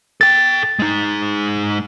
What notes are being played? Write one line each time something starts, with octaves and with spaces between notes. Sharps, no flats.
A4 G5 A6
G#3 D#4